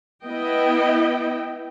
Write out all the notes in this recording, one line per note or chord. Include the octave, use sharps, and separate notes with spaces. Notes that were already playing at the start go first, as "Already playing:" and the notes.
B3 E4 D#5 G5